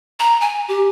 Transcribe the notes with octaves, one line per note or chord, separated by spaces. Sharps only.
A#5
G#5
G4